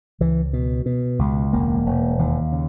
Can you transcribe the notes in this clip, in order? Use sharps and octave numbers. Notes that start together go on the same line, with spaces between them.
C#2 E3
B2
B2
C#2
E1 A#3
E1
D#2
C#3